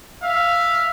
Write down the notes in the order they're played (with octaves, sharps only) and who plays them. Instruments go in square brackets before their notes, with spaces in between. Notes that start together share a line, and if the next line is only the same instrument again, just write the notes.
[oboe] E5 [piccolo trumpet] F5